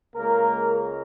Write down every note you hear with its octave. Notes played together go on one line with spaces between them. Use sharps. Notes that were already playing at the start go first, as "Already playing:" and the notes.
C#2 C#3 G#3 A#3 A#4